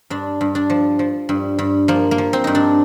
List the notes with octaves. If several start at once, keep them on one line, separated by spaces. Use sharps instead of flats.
G2 D4
G2
D4
F3
F3
G2
G2
F3 A#3
A#3
F3
C4
G2 D#4
D4